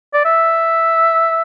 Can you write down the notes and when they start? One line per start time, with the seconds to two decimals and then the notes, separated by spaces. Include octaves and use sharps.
0.14 D5
0.25 E5